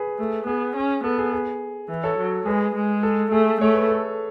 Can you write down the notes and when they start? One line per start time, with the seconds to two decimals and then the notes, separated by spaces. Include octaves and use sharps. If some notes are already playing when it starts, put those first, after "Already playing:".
Already playing: G#4 B4
0.18 A3
0.47 B3 G#4
0.76 C#4
1.04 B3 A4
1.18 G#4
1.32 G#4
1.89 E3
2.04 A4 C#5
2.18 F#3
2.46 G#3 G#4 B4
2.75 G#3
3.03 A4
3.31 A3 G#4
3.61 A3 C#5
3.75 B4
3.88 A4